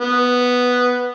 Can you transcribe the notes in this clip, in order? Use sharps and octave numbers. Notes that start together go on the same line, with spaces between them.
B3